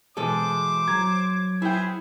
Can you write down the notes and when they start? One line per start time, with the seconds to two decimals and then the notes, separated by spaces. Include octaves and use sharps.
0.17 B2 E3 G#3 A4 C5 D6
0.88 F#3 A#5 G#6
1.62 B3 E4 G#4 C5 G5